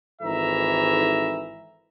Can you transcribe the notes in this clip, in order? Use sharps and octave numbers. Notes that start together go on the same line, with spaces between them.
G#1 G#2 E3 A4 E5 A#5